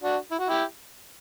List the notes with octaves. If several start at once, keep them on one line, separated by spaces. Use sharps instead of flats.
D4 F#4
E4
F#4
E4 G4